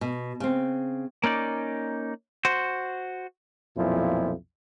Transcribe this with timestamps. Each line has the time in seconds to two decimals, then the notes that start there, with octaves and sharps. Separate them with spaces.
0.01 B2
0.40 C#3 C4
1.24 A#3 C#4 D#4 D5
2.45 F#4 C5
3.77 B1 F2 A#2 F3 E4